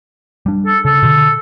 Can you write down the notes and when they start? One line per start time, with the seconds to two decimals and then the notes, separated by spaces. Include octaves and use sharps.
0.46 G3 D4
0.66 A4
0.85 C#3 A4
1.03 B2 D3